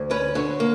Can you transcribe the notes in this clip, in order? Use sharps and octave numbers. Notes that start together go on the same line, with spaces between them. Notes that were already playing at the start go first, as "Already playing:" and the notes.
Already playing: D2
C#4 B4
D3 C#5
A#3